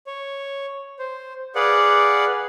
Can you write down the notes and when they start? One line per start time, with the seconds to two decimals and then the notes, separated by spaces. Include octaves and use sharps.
0.07 C#5
0.99 C5
1.55 G#4 B4 D5 F5 F#5